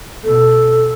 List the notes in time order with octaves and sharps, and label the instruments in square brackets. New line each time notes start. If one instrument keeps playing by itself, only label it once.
[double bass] B2 [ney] A4